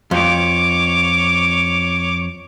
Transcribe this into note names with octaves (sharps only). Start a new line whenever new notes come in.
F2 C#5 D6